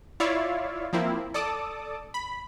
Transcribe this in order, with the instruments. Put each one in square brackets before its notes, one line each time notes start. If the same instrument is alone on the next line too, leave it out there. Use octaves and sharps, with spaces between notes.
[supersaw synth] E4 F4 C#5 D5 E5 F5
F3 A#3 C4 E4
A4 D5 A5 D6 D#6
B5